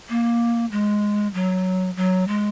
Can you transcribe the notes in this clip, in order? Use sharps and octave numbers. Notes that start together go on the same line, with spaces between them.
A#3
G#3
F#3
F#3
G#3